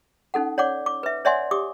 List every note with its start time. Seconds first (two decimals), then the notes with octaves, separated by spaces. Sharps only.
0.34 C#4 D#4 A4 F#5
0.58 C#5 D5 F#5 D6
0.86 D6
1.03 B4 E5
1.25 C#5 D5 E5 F#5 G#5 C6
1.51 G4 D6 D#6